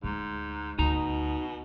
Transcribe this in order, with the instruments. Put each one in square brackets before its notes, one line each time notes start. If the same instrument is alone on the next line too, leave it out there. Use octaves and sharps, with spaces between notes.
[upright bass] D2 G#3 [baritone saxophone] G#2
[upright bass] D2 [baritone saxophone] B2 [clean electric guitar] D#4 A#5